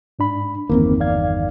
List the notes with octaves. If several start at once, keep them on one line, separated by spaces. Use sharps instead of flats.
G#2 D4 B5
G1 E2 D#3 A#3 C4
D5 F5 G#6